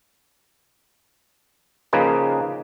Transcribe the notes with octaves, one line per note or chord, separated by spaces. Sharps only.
C#3 F3 A#3 D#4 G#4 B4